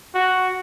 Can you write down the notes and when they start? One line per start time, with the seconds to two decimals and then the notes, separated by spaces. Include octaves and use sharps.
0.14 F#4